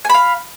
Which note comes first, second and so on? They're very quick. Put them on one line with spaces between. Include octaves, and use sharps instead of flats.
G#5 B5 F5